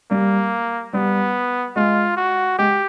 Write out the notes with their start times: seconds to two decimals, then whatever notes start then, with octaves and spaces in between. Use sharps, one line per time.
0.11 G3 A#3
0.93 G3 B3
1.76 G#3 F4
2.17 F#4
2.58 G#3 G4